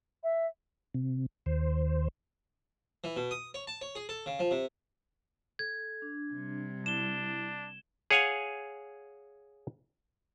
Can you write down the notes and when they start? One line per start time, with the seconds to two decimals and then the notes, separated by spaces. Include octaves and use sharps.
0.23 E5
0.94 C3
1.46 D#2 C5
3.04 E3
3.16 B2
3.31 D#6
3.54 C#5
3.67 A5
3.81 C#5
3.95 G#4
4.09 A4
4.26 C#3
4.39 F3
4.51 C3
5.59 A4 G#6
6.02 D4
6.33 C3 G3
6.86 D4 E4 E7 G7
8.11 G#4 C#5 F5 F#5 G#5